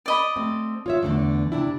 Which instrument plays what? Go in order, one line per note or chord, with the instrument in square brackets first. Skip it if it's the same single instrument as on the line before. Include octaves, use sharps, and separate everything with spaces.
[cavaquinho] D5 D#5 B5
[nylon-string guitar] A3 C4
F4 C#5 E5
E2 D3 A3
C3 D4 E4